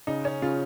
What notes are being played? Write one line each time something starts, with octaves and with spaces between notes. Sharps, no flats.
C#3 D#4
C#4
C#3 F4